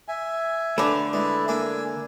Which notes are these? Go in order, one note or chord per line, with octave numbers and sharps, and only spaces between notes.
E5 G#5
D3 A3 B4 D5
G#3 E4 B4 D5
A#3 D4 G#5 E6